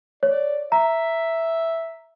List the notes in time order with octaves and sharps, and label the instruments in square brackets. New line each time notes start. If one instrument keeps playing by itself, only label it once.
[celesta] C#5 [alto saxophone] D5
[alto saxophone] E5 [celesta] A#5